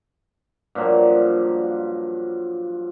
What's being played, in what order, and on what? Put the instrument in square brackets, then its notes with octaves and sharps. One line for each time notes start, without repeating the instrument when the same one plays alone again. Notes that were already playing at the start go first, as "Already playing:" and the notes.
[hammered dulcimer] G2 A#2 F3 F#3